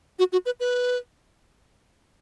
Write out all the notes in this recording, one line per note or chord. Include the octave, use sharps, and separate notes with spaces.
F#4
F#4
B4
B4